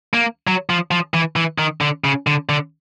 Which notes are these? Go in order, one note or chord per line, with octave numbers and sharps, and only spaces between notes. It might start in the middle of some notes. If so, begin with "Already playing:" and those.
A#3
F#3
F3
F3
E3
E3
D#3
D3
C#3
D3
D3